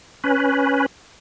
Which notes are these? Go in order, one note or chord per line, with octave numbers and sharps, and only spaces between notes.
C#4 B4